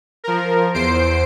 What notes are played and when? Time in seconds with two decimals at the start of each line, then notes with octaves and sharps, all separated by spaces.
0.24 F3 A#4
0.74 E2 C5 C7 D7